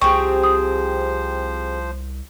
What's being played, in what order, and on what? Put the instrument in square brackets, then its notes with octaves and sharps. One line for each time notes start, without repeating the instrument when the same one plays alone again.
[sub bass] C2 [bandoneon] F3 C5 [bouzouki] C4 G4 G#4 [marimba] C#6
[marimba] D#6